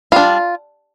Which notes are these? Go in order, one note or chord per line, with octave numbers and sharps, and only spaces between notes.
G3 D4 F4